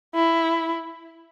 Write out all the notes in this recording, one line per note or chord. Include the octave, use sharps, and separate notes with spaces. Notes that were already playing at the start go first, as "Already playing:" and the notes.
E4